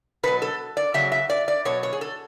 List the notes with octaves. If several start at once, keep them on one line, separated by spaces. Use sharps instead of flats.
B2 F#3 B4
A4
D5
C#3 F#3 E5
E5
D5
D5
B2 F#3 C#5
C#5
G#4
A4